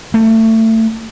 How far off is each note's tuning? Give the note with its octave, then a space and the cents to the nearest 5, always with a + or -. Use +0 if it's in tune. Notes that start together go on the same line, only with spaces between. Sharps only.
A3 +25